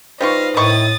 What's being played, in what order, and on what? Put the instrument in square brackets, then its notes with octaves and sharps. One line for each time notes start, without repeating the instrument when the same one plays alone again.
[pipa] G3 F4 C#6 [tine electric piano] D#4 B4 C5 [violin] D#5 F5
[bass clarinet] A2 [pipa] D#3 E4 C#6 [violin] D#6 A6